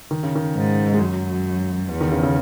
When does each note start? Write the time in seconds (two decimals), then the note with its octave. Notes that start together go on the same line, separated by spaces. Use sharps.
0.11 D#3
0.23 C#3
0.35 D#3
0.55 G#2
0.94 G#3
1.00 F#2 F#3
1.90 E2
2.01 D#3
2.12 C#3
2.23 C#3